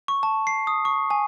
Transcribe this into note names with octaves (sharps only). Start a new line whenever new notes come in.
C#6
A5
C7
D#6
C#6
G#5